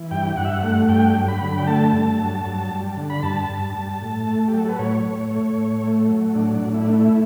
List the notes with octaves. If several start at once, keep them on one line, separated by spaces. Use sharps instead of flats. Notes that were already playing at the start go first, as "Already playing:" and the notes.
Already playing: E3
G2 G5
G2 F#5
E5
F#5
A3 F#5
G2 G5
F#3
B5
D3
G5
A3 A5
G2
F#3
G2
G3
D3
B5
G2 A5
G2
G3
A2
A3
G4
F#3 A4
B4
A2 C#5
A2
A3
A2
A3
F#3
A2 D4
D4
A2
E4
A3 D4
E4